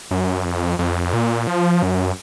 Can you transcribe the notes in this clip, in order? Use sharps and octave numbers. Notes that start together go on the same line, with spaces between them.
F#2
F2
F2
A#2
F3
F#2